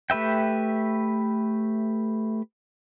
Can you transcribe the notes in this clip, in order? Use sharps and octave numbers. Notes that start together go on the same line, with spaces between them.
A3 G4 B4 E5 G5